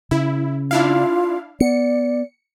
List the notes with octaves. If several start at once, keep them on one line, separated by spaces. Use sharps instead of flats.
C#3 E4
D4 E4 F4 F5
B3 D5 C#7